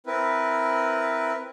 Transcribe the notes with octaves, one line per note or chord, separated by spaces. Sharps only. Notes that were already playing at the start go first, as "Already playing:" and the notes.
C4 E4 A#4 B4